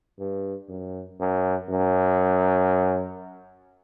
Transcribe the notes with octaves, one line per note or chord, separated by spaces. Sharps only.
G2
F#2
F#2
F#2